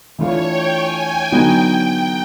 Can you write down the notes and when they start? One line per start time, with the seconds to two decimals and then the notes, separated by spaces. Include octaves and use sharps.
0.18 E3 A3 D4 F4 A4 C#5
0.47 G5
0.75 G#5
1.04 G5
1.32 D3 F#3 B3 D#4 F#4
1.61 G5